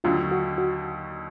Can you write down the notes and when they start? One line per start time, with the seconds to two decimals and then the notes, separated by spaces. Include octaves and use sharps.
0.04 D#2 D3 F#3 F4
0.32 F#4
0.58 F#4